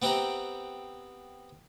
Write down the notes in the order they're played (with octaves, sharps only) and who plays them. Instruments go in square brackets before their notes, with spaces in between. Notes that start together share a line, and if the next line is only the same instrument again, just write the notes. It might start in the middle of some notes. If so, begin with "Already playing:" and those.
[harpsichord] B3 C4 G4 E5 F#5 A#5